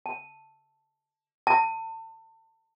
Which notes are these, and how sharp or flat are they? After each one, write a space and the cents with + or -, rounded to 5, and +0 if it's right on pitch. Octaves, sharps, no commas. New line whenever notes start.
A5 +0
A5 +35